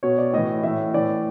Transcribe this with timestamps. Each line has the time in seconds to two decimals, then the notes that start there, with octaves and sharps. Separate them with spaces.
0.03 B2 C#5
0.18 D5
0.33 A2 E3 D#5
0.64 A2 E3 E5
0.94 A2 E3 D5